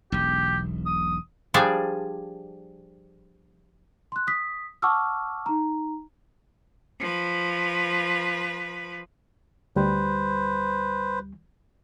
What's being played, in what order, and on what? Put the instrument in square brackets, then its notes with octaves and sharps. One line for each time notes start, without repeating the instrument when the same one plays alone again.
[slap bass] E1 B1 [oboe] G4
[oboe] D#6
[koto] F3 G3 D4 G#4 D5
[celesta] C6 F#6
D#6 B6
F#5 A5 C#6 D6 E6 F6
D#4 A#5
[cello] F3 B4
[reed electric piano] D2 G3 [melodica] B4 C5